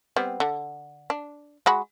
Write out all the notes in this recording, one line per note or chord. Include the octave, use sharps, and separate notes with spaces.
G3 B3 C4
D3
D4
G#3 F#4 B5